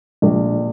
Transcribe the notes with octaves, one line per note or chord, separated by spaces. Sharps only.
A#1